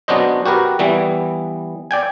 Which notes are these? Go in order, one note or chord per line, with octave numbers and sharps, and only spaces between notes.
F#3 B3 C#4 D4 C5 D#5
F#4 G4 A#4 B4
E3 G3 B3
D5 G5 G#5